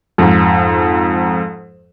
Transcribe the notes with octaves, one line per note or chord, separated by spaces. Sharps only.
F2 G#2